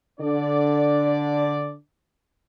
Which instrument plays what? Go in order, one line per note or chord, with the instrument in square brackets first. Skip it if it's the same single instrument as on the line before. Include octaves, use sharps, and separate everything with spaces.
[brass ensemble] D3 D4 D5